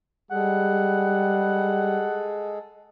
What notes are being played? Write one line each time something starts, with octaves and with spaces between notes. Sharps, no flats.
G3 G#3 G#4 A4 F#5